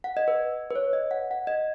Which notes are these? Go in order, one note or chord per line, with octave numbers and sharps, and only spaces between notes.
F#5
D#5
B4
B4
C#5
D#5
F#5
F#5
D#5